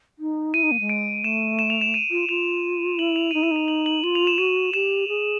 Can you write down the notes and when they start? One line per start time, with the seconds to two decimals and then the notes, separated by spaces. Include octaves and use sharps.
0.19 D#4
0.54 E4 D#7
0.63 D#4
0.71 A#3
0.80 G#3
0.89 D7
1.24 A3 E7
1.59 E7
1.70 F7
1.81 E7
1.94 D#7
2.11 F4
2.29 F4 F7
2.99 E4 F#7
3.16 F7
3.31 D#4 D#7
3.43 E4 E7
3.51 D#4 F7
3.68 F#7
3.86 F#7
4.03 F4 F#7
4.15 F7
4.27 E7
4.38 F#4 D#7
4.74 G4 E7
5.08 G#4